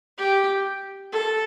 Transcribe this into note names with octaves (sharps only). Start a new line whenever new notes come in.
G4
A4